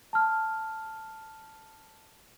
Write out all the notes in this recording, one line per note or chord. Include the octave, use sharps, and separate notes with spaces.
A5 F6